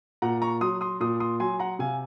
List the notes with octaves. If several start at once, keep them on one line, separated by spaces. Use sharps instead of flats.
A#2 F#5 A#5
A#5 C#6
F#3 C6 D#6
C6 D#6
A#2 C6 D#6
C6 D#6
F#3 G#5 C6
F#5 A#5
C3 F5 G#5